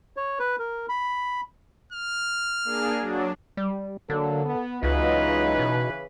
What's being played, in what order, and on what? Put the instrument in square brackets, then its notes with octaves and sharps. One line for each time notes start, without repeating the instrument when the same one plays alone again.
[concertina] C#5
B4
A#4
B5
[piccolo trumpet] F6
[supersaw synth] A#3 D4 G#4
F#3 D4
[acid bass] G3
[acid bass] D3 [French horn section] F#3 A#3 D4 [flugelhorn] A4
[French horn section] B3
[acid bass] C#2 [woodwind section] C#3 E3 B4 [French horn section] F#3 F4 D#5 [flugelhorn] D#4
[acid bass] B2